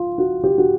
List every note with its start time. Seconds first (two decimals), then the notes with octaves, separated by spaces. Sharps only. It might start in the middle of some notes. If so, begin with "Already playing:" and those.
Already playing: F4
0.18 F#4
0.44 G4
0.58 F#4